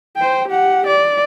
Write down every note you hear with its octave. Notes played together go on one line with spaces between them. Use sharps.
C5 G5
G4 F#5
D5